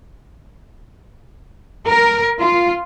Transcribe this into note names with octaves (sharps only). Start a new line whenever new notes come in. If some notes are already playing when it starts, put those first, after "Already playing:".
A#4
F4